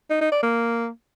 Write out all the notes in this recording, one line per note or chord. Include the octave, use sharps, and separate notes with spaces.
D#4
D#4
D5
A#3